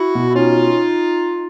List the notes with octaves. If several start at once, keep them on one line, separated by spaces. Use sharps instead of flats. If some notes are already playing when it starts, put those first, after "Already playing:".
Already playing: E4 F#4
B2
E4
C#4 D#4 F4